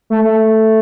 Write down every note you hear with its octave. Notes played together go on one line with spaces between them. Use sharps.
A3
A3